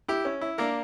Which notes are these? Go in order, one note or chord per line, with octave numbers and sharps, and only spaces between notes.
E4 G4
C#4
E4
A#3 D4 A#4